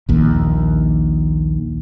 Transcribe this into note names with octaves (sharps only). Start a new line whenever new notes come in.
A#1 D#2